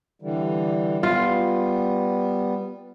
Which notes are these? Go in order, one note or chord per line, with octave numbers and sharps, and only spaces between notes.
D3 E3 G3
G3 B3 F4